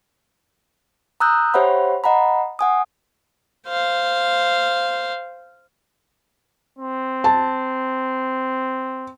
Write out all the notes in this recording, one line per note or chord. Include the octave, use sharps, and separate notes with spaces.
A#5 D#6 E6 F#6 G6
G4 C5 C#5 E5 F#5 B5
D#5 F#5 A#5 B5
F#5 G#5 D#6
C5 F5
C4
A5